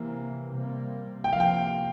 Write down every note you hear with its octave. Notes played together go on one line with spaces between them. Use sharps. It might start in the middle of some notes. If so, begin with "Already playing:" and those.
Already playing: C3 E3 A#3
C3 G3 A#3
C3 F3 A#3 G5
F5
G5